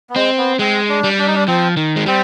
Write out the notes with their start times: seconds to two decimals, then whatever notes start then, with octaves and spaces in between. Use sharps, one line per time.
0.10 B3
0.15 G#3 C4
0.38 B3
0.59 G#3 C4
0.89 D4
1.04 G3
1.19 D4
1.27 D#4
1.35 D4
1.48 F3 C4
1.77 D#3
1.96 G#3
2.06 G3 C4